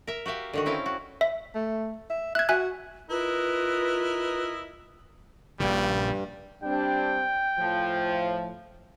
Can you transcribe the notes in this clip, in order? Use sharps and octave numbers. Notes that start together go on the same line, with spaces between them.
A#4 E5
F#4 G4 E5 F5
D3 D#3 F#4
C4 C#4 E4 F5 G5
F#4
E5
A3
E5
E5 F#6 G#6
F#4 E5 G#5 F#6
E4 F4 A#4 B4 D#5
A#1 G2 A#2 C#3 G3
G3 C4 D4 G5
A2 F3